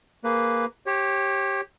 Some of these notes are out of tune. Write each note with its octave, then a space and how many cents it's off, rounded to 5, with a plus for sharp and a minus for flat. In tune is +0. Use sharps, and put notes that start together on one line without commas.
A#3 +0 G#4 +0 B4 +5
G4 +0 C#5 -35